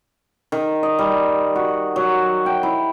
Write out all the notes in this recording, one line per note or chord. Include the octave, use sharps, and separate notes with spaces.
D#3
D#5
G3
F#4
F#3
G5
E4